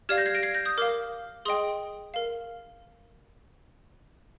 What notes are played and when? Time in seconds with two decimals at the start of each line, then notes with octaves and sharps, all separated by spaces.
0.09 G4 D5 F5 F6 G#6
0.17 G6 A#6
0.26 G#6 C7
0.35 A#6 D7
0.43 G#6 C7
0.54 G6 A#6
0.65 D#6 G6
0.77 A#4 F5 D6 F6
1.45 G#4 D#5 G5 C6 D#6
2.14 A#4 F5